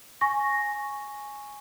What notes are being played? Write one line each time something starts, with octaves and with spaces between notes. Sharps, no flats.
G#5 C#6 A#6